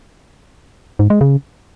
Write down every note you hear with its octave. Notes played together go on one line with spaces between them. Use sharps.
G#2
G#3
C#3